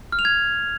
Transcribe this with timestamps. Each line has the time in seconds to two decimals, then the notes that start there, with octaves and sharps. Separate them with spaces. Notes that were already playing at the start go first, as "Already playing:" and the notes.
0.12 F6
0.19 F7
0.25 G#6